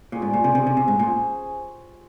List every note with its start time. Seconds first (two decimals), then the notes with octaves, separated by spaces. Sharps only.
0.12 A#2 G3 C#4 F4 G#4
0.22 G#2
0.34 A#2
0.44 C3
0.55 C3 C#4 G#4 C5
0.67 C3
0.77 C3
0.88 G#2
0.99 A#2 C#4 G#4 C5